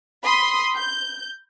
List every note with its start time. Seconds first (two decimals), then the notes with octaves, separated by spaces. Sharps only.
0.24 B5 C6 D#6
0.76 G6